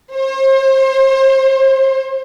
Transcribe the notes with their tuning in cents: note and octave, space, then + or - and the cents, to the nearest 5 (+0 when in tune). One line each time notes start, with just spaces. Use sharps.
C5 +35